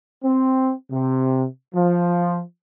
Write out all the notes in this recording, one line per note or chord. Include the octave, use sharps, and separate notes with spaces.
C4
C3
F3